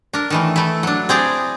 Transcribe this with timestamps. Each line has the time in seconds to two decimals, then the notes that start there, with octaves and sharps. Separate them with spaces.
0.13 D4 A#4
0.30 D#3 E3 A3
0.56 A3 E4
0.83 F#3 D4
1.09 C4 G#4 D5 A#5